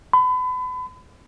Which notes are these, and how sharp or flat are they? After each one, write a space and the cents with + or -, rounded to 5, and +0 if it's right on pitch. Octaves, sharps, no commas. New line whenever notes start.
B5 +35